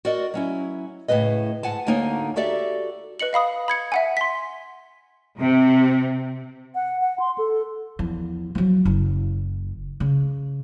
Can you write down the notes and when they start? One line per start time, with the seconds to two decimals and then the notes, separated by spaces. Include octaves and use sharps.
0.05 F#4 A#4 D5 D#5
0.34 F#3 C#4 E4
1.08 A2 C#3 G#3 B4 D#5
1.63 G#2 F#5 G#5 A5
1.87 D2 D3 A#3 D#4 C#5 G#5
2.36 F#4 G4 A4 D5 E5
3.20 B4 D#5 C#7 F#7
3.33 D#5 F5 B5 D#6
3.68 B5 G#6 C#7
3.92 E5 F#5 G#5
4.17 C6 B6
5.38 C3
6.75 F#5
7.01 F#5
7.20 C6
7.38 A4
7.99 E2 F3
8.55 F3 F#3
8.85 F#1
10.00 C#3